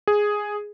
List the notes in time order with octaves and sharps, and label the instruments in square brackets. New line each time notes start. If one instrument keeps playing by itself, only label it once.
[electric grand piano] G#4